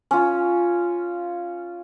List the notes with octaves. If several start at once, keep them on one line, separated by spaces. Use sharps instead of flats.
C#4 F4